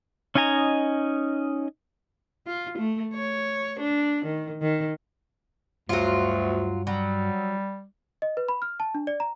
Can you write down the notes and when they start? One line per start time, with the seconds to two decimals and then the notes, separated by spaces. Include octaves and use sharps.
0.35 C#4 D#4 D#5 G#5 A#5
2.47 F4
2.78 A3
3.14 C#5
3.80 D4
4.25 D#3
4.61 D#3
5.89 D2 G2 F#3 F4 F#4 C#5
6.87 F#3 G3
8.22 D#5
8.37 B4
8.49 B5
8.62 F6
8.80 A5
8.95 D4
9.07 D5
9.20 A#5